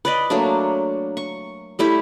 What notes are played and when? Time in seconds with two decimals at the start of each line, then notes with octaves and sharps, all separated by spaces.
0.05 B4 D5 D#5
0.30 F#3 A3 A#3 D4
1.17 C#6
1.79 G3 A3 E4 G4